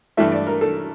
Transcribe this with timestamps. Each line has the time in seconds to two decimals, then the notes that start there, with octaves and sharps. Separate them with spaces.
0.17 G2 E3 A3 E5
0.32 D5
0.47 A#4
0.61 A4